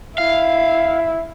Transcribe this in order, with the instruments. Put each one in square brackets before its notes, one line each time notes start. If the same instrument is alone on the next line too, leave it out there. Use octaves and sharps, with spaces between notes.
[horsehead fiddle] E4 [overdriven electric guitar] F5